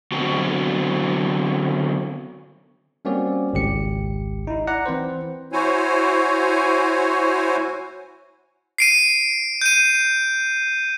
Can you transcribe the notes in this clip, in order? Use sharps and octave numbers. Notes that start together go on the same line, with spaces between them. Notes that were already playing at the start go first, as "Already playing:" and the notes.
D3 F#3 B3 C4 F#4 G5
G3 A#3 C4 C#4 F#4 D5
G#1 C#2 G4 C#7
D#4 E4
D5 F#5 A#5
E3 C4 B4 C5
E4 F#4 C5 C#5 G#5
C7 D7 D#7
G6 D#7